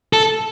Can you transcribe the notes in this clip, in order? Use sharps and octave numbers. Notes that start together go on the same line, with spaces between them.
A4